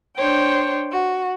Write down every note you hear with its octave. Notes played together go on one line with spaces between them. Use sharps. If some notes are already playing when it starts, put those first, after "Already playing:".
D4 C5 C#5 G5
F#4